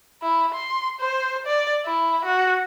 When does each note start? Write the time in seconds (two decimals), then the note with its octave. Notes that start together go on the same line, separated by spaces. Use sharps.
0.22 E4
0.54 C6
1.00 C5
1.46 D5
1.85 E4
2.25 F#4